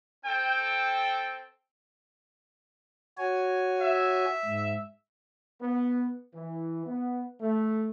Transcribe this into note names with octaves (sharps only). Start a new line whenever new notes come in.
C4 A4 G5
F#4 C#5 G#5
E5
G#2
B3
E3
B3
A3